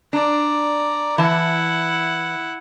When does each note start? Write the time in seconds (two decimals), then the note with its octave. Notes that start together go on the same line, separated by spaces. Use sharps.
0.13 D4 D5 A#5
1.18 E3 E4 F#5 A5